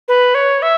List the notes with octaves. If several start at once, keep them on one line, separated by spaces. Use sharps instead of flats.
B4
C#5
E5